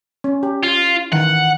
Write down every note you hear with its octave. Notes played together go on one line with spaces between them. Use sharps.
C#4
G4
F4
D#3 E3 F#5